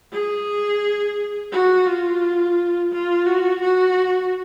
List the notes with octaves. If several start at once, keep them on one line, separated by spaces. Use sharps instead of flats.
G#4
F#4
F4
F4
F#4
F#4